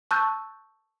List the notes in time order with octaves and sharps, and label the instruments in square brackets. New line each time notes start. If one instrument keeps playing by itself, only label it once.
[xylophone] A5 C#6 E6 F#6 G6 A6